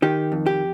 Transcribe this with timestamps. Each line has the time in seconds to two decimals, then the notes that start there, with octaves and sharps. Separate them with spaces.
0.02 D#3 G4
0.32 F2
0.46 G4